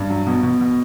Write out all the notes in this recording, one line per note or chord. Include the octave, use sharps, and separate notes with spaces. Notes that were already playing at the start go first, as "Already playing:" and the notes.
Already playing: G2
F#3
B2
B2
B2